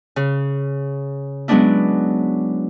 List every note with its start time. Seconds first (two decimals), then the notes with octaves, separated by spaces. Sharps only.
0.16 C#3
1.48 F#3 G#3 B3 C#4 D4 E4